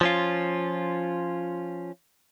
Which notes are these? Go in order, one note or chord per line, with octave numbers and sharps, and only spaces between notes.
F3 C#4 F4